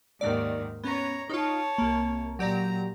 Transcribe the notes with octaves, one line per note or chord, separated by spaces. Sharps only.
D#2 G#2 D#3 D5
B3 C#4 C#5 A#5
D#4 F4 C#5 A5
C2 A#3
A#2 F#3 G4 D5 A#5